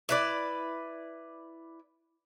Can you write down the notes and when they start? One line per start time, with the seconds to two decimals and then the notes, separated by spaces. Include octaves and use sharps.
0.09 E4 B4 D5